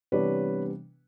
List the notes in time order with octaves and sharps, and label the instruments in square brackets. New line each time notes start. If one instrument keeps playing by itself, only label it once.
[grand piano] C3 E3 G3 B3 D4 B4 C#5